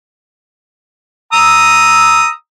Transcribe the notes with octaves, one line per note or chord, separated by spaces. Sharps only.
A#5 D#6 E6